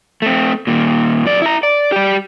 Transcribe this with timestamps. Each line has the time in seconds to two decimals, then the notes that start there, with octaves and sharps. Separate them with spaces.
0.22 A3 C4
0.67 D#2 A#2
1.26 F#2 D5
1.42 E4 A#5
1.63 D5
1.92 G3 G4